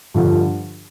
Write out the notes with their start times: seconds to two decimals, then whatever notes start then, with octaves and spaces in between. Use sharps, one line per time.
0.14 G2 D3 F3